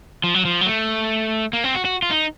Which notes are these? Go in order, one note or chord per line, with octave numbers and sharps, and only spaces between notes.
F3
F#3
F3
F#3
A3
A#3
C4
F#4
F#4
F4
D#4